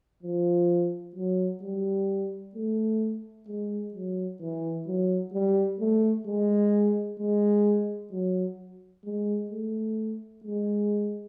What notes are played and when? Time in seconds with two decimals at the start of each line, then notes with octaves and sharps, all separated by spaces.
0.23 F3
1.15 F#3
1.62 G3
2.55 A3
3.48 G#3
3.94 F#3
4.41 E3
4.87 F#3
5.33 G3
5.80 A3
6.26 G#3
7.19 G#3
8.12 F#3
9.05 G#3
9.51 A3
10.44 G#3